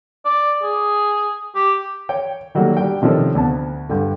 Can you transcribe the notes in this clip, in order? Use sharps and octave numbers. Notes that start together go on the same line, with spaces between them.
D5
G#4
G4
C#5 G5
D#3 F#3 G3 A3 A#3
G3 D4 G5
C3 D#3 F3 C#4 A4 C5
D2 B3 A5
G2 D3